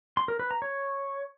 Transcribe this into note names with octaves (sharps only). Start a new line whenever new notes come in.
C6
A#4
B4
A#5
C#5